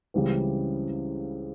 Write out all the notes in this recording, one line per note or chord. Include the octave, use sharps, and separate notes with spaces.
C#2 C#3 E3 G3 C4